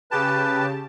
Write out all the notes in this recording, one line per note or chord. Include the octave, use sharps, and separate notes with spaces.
C#3 G4 B4 A5